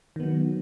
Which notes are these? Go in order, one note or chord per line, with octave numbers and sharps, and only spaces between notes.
D#3 F#3 B3